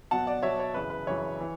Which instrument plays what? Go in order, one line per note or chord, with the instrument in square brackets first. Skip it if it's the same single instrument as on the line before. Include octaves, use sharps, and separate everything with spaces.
[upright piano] B2 F#3 F#5 A5
D5 F#5
B2 F#3 C#5 E5
C#5
F#2 C#3 E3 B4
B4
F#2 C#3 E3 C#5
E3